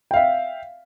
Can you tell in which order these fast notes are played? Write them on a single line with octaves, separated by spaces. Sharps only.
G5 F5 E5